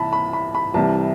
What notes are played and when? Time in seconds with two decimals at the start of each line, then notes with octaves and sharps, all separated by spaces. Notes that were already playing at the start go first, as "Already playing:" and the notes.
Already playing: C2 C3 E3 A5 B5
0.13 B5
0.33 B5
0.55 B5
0.74 C2 C3 E3 G3 A5